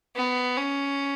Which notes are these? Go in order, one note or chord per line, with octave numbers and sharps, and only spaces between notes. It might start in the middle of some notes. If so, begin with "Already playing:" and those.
B3
C#4